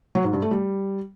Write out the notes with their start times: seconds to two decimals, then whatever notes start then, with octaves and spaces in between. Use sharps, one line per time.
0.15 F#3
0.24 G#2
0.33 G2
0.42 A3
0.51 G3